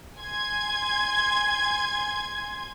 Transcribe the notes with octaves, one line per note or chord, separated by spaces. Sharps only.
G#5 C6 G#6